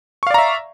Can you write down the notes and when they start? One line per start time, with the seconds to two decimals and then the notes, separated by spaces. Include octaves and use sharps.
0.23 C#6
0.27 F5
0.30 D5
0.34 A#5
0.38 E5